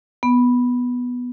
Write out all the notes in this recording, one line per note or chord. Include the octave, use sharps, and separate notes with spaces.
B3